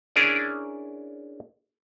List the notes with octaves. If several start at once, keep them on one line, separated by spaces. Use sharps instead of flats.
C#4 D4 E4 G#4 A#4 D5